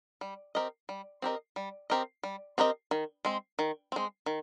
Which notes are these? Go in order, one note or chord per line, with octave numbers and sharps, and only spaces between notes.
G3
C4 G4 A#4 D#5
G3
C4 G4 A#4 D#5
G3
C4 G4 A#4 D#5
G3
C4 G4 A#4 D#5
D#3
G#3 C4
D#3
G#3 C4
D#3